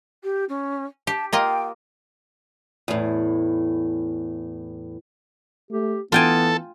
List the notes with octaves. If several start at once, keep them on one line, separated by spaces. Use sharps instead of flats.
G4
C#4
G4 A5
A#3 F4 D#5 G5
E2 A2
A3 G4
E3 B3 F4 A4 G5 G#5